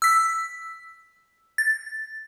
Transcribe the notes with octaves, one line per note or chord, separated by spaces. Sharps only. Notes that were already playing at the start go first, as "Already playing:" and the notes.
E6 B6
A6